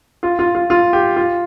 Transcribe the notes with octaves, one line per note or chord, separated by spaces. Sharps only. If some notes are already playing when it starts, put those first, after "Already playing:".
F4
F4
F4
F4
G4
F4